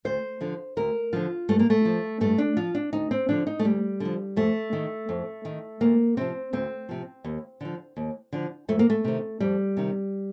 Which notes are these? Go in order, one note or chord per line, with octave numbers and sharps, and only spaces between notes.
D2 C5
D3 F3
D2 A#4
D3 F3 F4
G2 A3
A#3
A3
F3
G2 A3
D4
F3 F4
D4
D2 D#4
C4
D3 F3 D4
D#4
A3
D2 G3
D3 F3
F2 A3
D#3
F2
D#3
D2 A#3
C3 F3 C4
D2 C4
C3 F3
D#2
D3 F3
D#2
D3 F3
F2 A3
A#3
A3
C3 D#3
F2 G3
C3 D#3